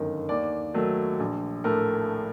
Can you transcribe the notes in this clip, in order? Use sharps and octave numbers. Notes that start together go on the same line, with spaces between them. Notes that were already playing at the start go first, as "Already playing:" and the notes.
Already playing: G1 F#2 D#3
D#2 D5
D#3 F#3 A3
A#1
A2 A3 A#4